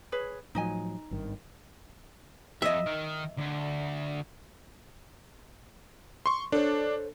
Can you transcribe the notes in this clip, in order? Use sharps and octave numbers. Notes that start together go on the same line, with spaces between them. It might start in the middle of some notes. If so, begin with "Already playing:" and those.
G#4 B4 C#5
A2 F3 F#3 D#4 D#5 G#5
G#1 G2 D#3
F2 D#5 E5
D#3
D2
C6 C#6
D4 A4 C5 C#5